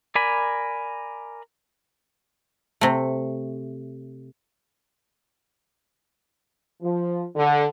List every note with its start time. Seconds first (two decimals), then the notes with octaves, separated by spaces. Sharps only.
0.15 A#4 D5 G#5 B5
2.81 C3 A3
6.82 F3
7.36 D3